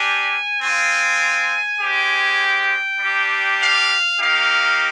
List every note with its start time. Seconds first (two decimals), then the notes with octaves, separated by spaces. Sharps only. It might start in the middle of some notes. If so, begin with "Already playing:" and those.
Already playing: G3 D4 G4 G#5
0.61 C4 F4 G#5
1.80 G#3 C4 G4
2.40 G5
3.00 G3 D4 G4
3.60 F5
4.20 A#3 D#4 G4 F5